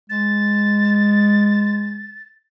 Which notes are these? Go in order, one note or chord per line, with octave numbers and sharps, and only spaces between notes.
G#3 A6